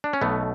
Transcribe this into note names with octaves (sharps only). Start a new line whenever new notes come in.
D4
C#4
B1 B2 A3 B3